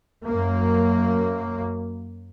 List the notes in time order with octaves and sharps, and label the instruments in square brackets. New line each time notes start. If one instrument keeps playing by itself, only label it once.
[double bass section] F#2 A#3